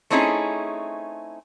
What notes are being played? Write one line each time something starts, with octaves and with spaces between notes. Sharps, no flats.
A3 C4 C#4 D#4 E4 G#4